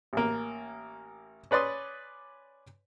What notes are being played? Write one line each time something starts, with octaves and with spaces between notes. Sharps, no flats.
A1 A#3
C#4 B4 D5 C6 D#6